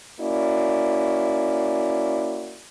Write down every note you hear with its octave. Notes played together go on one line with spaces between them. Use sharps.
A#3 C#4 E4 F#4 D5